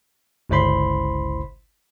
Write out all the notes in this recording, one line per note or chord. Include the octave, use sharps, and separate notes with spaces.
G1 C#2 E4 C5 B5 C6